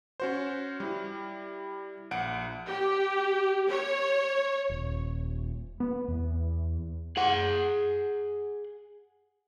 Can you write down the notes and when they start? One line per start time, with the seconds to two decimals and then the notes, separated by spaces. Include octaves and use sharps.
0.20 C#4 F#4 C5
0.80 G3 E4
2.11 A#1 F#5 D7
2.69 G4
3.69 C#5
4.70 D#1
5.80 B3
6.08 E2
7.17 G#4 F#5